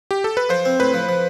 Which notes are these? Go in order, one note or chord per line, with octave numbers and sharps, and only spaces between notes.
G4
A4
B4
F3 C5
C4
A2 B4
F3
F3